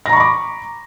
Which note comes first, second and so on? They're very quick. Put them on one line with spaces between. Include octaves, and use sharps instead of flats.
A#6 A#5 C#6 B5 D6